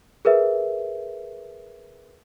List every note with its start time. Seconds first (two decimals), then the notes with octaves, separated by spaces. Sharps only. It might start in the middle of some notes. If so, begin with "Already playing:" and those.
0.25 G#4 A#4 B4 E5